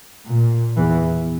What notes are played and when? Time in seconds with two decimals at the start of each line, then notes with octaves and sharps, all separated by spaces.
0.27 A#2
0.78 E2 E3